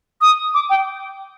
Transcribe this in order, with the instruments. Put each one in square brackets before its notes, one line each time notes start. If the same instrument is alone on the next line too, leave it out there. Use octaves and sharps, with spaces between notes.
[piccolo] D#6
D6
G5